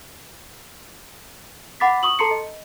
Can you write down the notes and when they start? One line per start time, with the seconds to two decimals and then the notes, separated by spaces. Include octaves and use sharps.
1.80 F#5 B5 D6 A6 B6
2.03 C#6 D#6 F#7
2.19 A4 A5 A#5 C6 C7 C#7
2.31 D#5